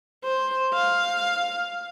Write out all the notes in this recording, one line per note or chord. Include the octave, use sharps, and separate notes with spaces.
C5
F5